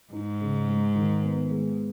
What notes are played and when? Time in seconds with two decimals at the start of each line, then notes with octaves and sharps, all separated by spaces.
0.13 G#2 D#4
0.41 C#3
0.69 G#3
0.95 D#3
1.23 B3
1.51 G#3